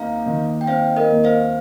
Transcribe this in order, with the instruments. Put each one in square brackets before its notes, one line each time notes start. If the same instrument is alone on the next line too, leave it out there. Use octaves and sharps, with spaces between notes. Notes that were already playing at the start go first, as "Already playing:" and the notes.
Already playing: [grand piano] D#2 C4 D#4 [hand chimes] F5 A#5
[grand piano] D#3
[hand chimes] G5
[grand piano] C4 [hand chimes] C5 F5
[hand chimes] A#4 D#5
[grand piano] D#2
[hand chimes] C5 F5